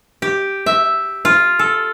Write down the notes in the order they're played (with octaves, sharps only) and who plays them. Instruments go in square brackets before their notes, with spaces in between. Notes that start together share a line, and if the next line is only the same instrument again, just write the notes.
[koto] G4
E5
F4
A4